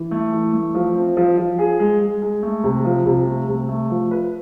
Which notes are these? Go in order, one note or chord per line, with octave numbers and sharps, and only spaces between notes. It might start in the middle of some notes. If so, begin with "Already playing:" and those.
Already playing: E3
A3
E3
A3
F3
C4
F3
F3
G#4
G#3
G#3
G#3
A3
C3
F3
C3
A3
C3
A3
F3
B4